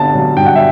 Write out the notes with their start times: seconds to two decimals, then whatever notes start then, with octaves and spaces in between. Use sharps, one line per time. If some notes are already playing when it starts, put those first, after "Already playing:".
Already playing: G1 G2 B3 A5
0.15 F#3
0.36 G2 G5
0.46 F#5
0.56 E5